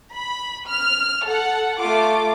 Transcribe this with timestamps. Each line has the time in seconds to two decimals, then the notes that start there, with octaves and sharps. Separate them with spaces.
0.13 B5
0.68 F6
1.24 A4 F#5
1.80 A3 F4 D6